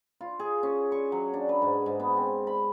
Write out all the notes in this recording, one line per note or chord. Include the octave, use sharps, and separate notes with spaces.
F4
G#4
C#4
C#6
F#3
D4
B4
G#2
G#2
B3
C4
B5